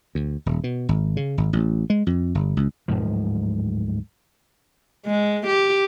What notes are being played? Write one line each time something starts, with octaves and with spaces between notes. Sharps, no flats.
D2
D#1
B2
G#1
C#3
G#1
A1
G#3
F2
G1
C#2
D1 C#2 G#2 F3
G#3
G4